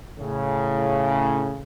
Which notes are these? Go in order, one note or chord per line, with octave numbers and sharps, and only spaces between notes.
A2 C#3